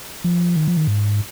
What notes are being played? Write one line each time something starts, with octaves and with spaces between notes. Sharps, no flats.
F3
D#3
F3
D#3
G#2